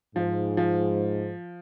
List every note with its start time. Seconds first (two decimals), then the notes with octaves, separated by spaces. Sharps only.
0.16 G#2 F3
0.57 F3